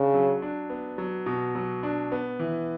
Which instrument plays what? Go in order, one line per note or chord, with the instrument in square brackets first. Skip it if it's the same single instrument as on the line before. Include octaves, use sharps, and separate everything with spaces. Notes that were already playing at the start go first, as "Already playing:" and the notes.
Already playing: [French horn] C#3 [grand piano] D4
[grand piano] F#3
D4
B3
F#3
B2
F#3
D4
B3
E3